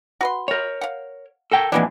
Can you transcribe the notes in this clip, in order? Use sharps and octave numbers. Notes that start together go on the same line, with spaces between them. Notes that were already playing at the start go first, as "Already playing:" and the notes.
F#4 B4 C6
A#4 C#5
F5 F#5
A4 A#4 G5
F2 A#2 E3 G#3 B3 D4